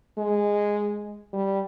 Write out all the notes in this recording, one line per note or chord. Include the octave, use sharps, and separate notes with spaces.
G#3
G3